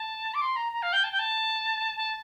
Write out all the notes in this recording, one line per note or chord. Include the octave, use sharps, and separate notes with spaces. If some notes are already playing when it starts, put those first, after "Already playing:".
Already playing: A5
D6
C6
A#5
A#5
F5
G5
A5
G5
A5
A5